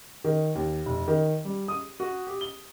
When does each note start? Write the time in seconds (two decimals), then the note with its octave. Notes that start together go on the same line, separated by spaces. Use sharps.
0.24 D#3
0.55 D#2
0.86 F1
1.08 D#3
1.45 G3
1.68 D#6
2.00 F#4
2.27 G4
2.41 G7